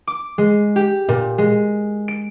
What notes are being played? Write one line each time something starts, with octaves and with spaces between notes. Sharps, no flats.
D6
G#3
G4
A#2
G#3
D7